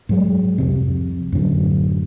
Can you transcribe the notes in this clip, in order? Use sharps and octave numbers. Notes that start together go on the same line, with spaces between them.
G#2 F#3 G#3
C2 F2 C3
F#2 A2 D3 F#3